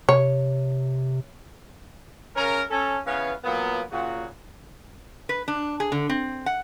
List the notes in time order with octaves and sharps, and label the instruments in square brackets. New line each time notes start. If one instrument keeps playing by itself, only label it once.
[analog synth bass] C3 [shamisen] C#5
[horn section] C#3 C#4 A#4
C#4 A4
C#3 E3 B3 B4 C#5 F5
A#2 F#3 A#3 B3
A#2 C#3 F#4
[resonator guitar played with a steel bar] B4
D4
G#4
D3
C4
F#5